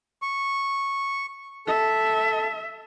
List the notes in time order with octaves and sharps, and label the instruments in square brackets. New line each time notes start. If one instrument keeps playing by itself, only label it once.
[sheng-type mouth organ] C#6
[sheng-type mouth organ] A4 [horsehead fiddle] E5